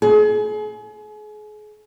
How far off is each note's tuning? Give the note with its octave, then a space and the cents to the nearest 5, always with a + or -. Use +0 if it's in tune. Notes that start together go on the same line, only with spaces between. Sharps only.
G#4 +35